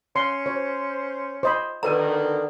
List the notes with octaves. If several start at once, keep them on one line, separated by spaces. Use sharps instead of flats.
C#4 C6
C5 C#5
C5 D#5 B5
B2 D3 D#3 A#4 B4 A#5